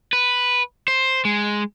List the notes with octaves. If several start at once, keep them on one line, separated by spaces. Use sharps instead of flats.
B4
C5
G#3